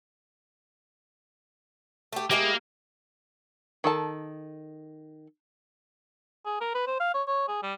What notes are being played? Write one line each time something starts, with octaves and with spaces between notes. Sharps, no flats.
A3 G4
G#3 A#3 E4 G4
D#3 A4 A5
G#4
A#4
B4
C5
F5
C#5
C#5
G#4
G3